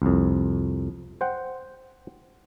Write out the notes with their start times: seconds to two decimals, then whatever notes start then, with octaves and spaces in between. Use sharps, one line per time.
0.02 C2 F2
1.21 C5 F#5 G5